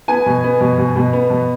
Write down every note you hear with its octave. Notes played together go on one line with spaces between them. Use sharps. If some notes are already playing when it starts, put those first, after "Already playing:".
B3 G#5
B2
B3
B2
B2
B2
B3
B2